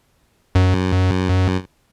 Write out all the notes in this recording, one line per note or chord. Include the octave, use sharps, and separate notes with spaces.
F#2